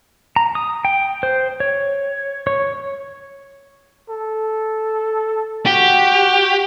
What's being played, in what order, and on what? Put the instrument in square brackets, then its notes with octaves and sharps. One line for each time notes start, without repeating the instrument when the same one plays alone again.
[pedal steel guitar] A#5
D#6
G5
C5
C#5
C#5
[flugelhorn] A4
[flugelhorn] F#4 [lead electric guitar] G4